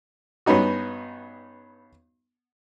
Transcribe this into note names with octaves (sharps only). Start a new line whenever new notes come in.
G2 B3 C#4 D#4 F#4